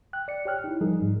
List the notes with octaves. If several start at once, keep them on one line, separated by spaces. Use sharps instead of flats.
G5 F#6
D5 C#7
G4 C#5 G5 F6 F#6
D#4 E4
F3 G3 D#4 G#4 A#4
G#2 G3 D#4